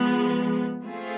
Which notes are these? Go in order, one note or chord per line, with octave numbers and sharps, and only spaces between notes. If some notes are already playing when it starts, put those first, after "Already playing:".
Already playing: F3 G#3 B3
A3 C4 F4 G#4